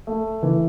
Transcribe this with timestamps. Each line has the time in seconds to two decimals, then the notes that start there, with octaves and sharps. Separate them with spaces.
0.07 A3
0.43 E3